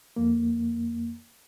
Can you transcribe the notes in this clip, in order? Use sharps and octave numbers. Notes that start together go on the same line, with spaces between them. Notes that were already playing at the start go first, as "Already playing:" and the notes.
F2 A#3